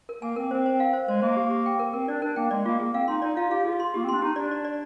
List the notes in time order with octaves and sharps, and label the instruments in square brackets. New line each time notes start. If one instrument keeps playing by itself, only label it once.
[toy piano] A#4
[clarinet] A#3 [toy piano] G#5
[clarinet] C4 [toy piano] A#4
[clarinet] C4 [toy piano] C5
[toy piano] C5
F5
C5
[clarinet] G#3 [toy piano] C5
[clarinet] A#3 [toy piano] C5
[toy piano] G4
G4
G5
A#4
[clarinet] C4 [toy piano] A#4
[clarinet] D4 [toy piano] D5
[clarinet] D4 [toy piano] A#4
[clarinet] A#3 [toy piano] G5
[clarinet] G#3 [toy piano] D5
[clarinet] A#3 [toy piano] F4
[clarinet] A#3 [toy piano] G#4
[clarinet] C4 [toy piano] F5
[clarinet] D#4 [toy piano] C6
[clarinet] D#4 [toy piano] D5
[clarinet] F4 [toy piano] F5
[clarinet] G4 [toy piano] F5
[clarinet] F4 [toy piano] G#4
[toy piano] C6
[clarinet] A#3 [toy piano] G4
[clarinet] C4
[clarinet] D4 [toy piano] C6
[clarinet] D#4 [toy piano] G4
[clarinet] D4 [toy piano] D5
[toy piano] D5
D5